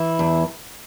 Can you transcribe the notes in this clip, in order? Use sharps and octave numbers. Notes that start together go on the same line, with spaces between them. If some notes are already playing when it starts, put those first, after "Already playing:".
Already playing: E3 E4
E2